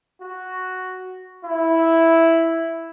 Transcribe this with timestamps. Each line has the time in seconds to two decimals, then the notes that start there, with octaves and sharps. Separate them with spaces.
0.22 F#4
1.45 E4